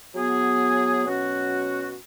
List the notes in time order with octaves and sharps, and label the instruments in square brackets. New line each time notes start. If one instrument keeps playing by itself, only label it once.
[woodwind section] F#3 B3 G#4
B2 F#3 C#4 F#4